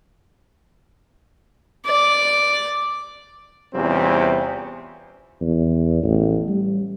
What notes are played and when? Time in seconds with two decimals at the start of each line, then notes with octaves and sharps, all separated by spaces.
1.86 D5
3.74 E2 C3 G3 C4 C#4 F4
5.41 E2
6.03 A1
6.48 G3